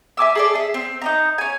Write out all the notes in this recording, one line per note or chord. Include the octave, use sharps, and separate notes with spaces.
E5 G#5 D6 E6
G#4 A4 D5
G#4 E5
C4
D#4 D#5 A#5
C#4 G#5